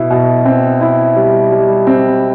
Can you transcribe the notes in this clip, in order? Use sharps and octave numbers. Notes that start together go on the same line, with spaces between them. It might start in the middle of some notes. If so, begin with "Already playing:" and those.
Already playing: B2 E4
B2
C4
E4
G3
G3
C4